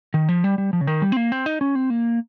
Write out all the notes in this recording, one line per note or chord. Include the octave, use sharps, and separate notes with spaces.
D#3
F3
G3
G3
F3
C#3
D#3
G3
C4
A#3
C4
D#4
C#4
C4
A#3